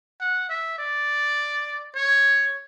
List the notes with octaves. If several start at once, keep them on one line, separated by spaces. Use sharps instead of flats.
F#5
E5
D5
C#5